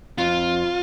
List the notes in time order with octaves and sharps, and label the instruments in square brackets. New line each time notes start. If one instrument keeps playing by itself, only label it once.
[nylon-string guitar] F2 [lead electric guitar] F4